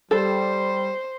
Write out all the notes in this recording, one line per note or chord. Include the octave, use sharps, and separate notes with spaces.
G3 A4 C5